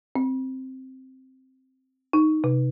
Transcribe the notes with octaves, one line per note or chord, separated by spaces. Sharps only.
C4
D#4
C3